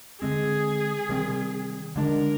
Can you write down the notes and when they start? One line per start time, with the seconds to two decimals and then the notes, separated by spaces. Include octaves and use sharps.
0.22 D3 G#3 C4 G#4
1.09 C3 D#3 G3 C4
1.96 D3 G#3 D4 A#4